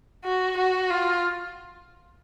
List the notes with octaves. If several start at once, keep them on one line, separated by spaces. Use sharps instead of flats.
F#4
F#4
F4